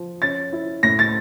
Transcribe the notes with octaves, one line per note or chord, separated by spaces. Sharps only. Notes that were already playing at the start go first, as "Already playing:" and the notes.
Already playing: F3
C#4 A6
E4
A2 A#6
A6